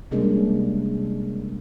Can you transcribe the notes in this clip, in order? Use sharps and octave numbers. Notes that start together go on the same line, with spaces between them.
C3 G3 G#3 A#3 C#4 D4